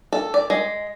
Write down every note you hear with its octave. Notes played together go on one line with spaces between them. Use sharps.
A4
D5
G#3